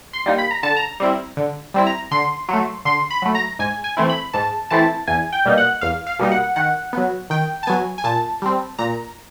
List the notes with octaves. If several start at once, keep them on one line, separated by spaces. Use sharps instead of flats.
C6
G3 A#3 D#4
B5
A#5
D3 A5
A#5
G3 C4 E4
D3
G3 C4 E4
A#5
D3 C6
F#3 A3
D3 C6
B5
F#3 A3
A#5
G#2 G#5
G#5
E3 A3 C4 E4
B5
G#2 A5
E3 A3 C4 E4 A5
E2 G#5
G5
B2 G3 A#3 D#4
F#5
E2 F5
F5
B2 G3 A#3 D#4
F#5
D#3 F#5
F#3 B3
D#3 G5
A5
F#3 B3 G#5
G#5
A#2 A5
G3 C4
A#2 A#5